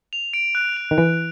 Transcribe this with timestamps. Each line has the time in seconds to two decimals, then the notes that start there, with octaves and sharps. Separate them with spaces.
0.13 F7
0.33 D7
0.55 F#6
0.77 F7
0.91 D#3
0.98 E3 D7